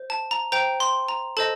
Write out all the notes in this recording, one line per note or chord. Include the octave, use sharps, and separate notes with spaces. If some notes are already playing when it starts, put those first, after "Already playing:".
Already playing: C5
A5
A#5
C5 G5 A#5
C6
A#5
A4 C5 D#5 A5